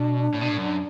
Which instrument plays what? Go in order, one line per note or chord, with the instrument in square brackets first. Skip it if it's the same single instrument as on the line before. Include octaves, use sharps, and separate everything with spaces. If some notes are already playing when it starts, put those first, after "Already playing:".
Already playing: [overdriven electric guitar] B2 [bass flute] D4
[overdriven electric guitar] A2
B2
A2
F#2